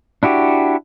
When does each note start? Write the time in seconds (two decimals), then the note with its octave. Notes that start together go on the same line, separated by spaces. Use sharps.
0.23 D4 E4 F#4 G4